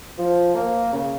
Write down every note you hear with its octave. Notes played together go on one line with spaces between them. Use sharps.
F3
A#3
C#3